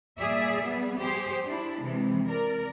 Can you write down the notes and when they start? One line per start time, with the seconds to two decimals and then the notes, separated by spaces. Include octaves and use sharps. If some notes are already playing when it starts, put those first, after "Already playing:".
0.19 A#2 G3 G#4 D5 E5
0.62 G3 B3 G#4
0.98 G4 G#4 C5
1.46 D4 E4
1.82 C3 E3 G#3
2.27 A#4 D5